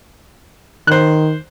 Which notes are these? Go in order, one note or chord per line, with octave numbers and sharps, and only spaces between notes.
D#3 C5 F#6